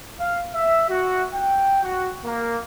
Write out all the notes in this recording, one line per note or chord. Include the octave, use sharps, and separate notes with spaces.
F5
E5
F#4
G5
F#4
A#3